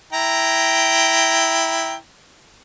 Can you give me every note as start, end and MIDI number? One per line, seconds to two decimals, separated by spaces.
0.13 1.95 64
0.13 1.95 79
0.13 1.95 82